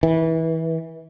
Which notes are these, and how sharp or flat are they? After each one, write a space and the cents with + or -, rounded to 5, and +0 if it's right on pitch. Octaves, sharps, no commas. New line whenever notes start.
E3 -25